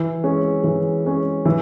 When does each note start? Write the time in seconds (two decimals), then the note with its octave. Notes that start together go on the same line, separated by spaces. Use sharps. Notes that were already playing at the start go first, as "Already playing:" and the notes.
Already playing: E3
0.24 G#3 C#4
0.64 E3
1.05 G#3 C#4
1.45 E3